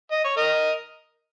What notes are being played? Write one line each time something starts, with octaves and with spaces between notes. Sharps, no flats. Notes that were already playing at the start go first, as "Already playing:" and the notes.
D#5
C#5
A#4 D#5